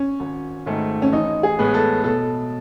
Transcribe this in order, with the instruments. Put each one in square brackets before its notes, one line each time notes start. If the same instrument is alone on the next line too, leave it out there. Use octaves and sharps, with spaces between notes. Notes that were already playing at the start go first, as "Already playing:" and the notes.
Already playing: [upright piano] C#4
[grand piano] G#1
G#2 D#3 A3
[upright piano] C#4
[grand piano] A1 [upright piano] D#4
[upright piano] G#4
[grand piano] A2 G#3 B3
[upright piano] A4
[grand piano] B2 [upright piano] A4